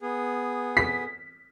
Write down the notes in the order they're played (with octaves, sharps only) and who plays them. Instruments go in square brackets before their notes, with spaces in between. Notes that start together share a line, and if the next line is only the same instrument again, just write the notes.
[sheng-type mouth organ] B3 G#4
[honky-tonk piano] B6